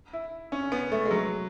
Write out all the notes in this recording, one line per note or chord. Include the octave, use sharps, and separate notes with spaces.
E4
C#4
B3
A3
G#3
F#3